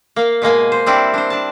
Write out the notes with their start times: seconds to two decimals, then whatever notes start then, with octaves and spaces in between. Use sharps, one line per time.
0.16 A#3 F5
0.42 B2 G#3 A#3 G#5
0.72 C5
0.86 G3 C4 D4 E4
1.14 D4 C5
1.30 D4 A5